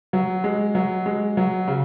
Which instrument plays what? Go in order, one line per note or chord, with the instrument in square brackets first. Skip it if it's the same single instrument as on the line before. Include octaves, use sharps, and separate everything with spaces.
[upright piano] F#3
G#3
F#3
G#3
F#3
C#3